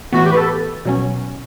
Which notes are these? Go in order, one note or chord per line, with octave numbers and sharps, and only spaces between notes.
A2 E3 B3 F#4
G4
B4
A4
B2 F#3 C#4